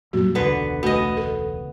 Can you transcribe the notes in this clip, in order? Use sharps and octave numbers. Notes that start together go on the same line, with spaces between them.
F#2 A#2 G3 F#4
E1 C#2 D3 B3 B4
A3 B3 F#4 D#5
A4